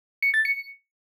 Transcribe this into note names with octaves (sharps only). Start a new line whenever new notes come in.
C#7
A6
C#7